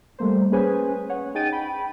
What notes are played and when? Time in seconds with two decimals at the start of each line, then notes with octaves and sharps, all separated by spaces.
0.19 G3 A3 A#3 C5
0.52 C#4 G#4 B4 C5 G#5
1.09 C#5 F#5
1.35 D#4 G#4 G5 A6 D#7
1.52 G5 B5